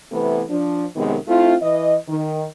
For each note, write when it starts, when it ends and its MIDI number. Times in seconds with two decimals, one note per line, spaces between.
0.12 0.42 48
0.12 0.42 52
0.12 0.42 57
0.12 0.42 59
0.49 0.85 53
0.49 0.85 62
0.96 1.16 42
0.96 1.16 48
0.96 1.16 51
0.96 1.16 56
0.96 1.16 59
1.27 1.55 57
1.27 1.55 60
1.27 1.55 64
1.27 1.55 65
1.62 1.97 52
1.62 1.97 75
2.08 2.45 51